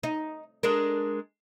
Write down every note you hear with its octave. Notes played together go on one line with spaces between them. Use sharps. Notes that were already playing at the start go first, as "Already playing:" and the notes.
D#4
G#3 D4 A#4